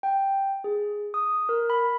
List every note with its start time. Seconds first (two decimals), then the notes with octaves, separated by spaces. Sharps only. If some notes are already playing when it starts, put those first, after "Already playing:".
0.03 G5
0.64 G#4
1.14 D#6
1.49 A#4
1.70 B5